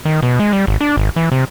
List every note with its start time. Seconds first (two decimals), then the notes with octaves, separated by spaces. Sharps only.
0.05 D#3
0.23 B2
0.40 G#3
0.53 G3
0.67 G#1
0.81 D4
0.97 G#1
1.16 E3
1.32 C3